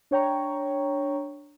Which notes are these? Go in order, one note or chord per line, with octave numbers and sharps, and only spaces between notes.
D4 C#5 G5 A#5 C#6